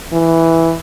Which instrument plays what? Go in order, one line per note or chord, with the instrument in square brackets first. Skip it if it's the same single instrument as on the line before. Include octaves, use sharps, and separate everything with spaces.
[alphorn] E3